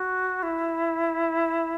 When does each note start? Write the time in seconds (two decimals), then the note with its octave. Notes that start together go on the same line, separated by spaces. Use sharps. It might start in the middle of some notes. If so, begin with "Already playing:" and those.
Already playing: F#4
0.43 E4